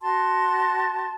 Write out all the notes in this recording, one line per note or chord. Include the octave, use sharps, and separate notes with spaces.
F#4 A5 C6